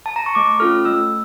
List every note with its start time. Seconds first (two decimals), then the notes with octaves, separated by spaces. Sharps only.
0.06 A5
0.16 A#5
0.26 C#6
0.35 A3 D6
0.60 C#4 F4 A4 F6
0.85 A3 E6